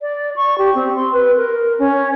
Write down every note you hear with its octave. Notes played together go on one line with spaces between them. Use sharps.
D5
C#6
G4
C4
C6
B4
A#4
C#4